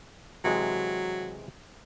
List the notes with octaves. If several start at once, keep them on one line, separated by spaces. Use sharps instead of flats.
C3 E3 F#3 G#3